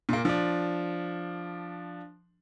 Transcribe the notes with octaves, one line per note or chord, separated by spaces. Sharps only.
A#2 A#3
F3 D4